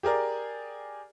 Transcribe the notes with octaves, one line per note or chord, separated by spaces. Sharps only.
G4 G#4 A#4 D5